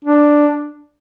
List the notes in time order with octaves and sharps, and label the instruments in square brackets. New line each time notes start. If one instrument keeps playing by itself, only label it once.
[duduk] D4